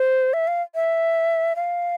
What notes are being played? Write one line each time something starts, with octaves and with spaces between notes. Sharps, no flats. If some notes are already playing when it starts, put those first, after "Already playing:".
Already playing: C5
E5
F5
E5
F5